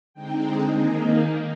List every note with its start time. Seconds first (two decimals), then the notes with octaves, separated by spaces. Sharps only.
0.14 D3 G#3 C4 D#4 G5
0.73 D#3 A#3 D#4 G#5